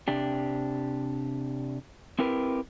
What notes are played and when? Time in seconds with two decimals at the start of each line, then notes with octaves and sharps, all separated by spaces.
0.08 C3 D4 G4
2.19 C4 E4 G4 A#4 B4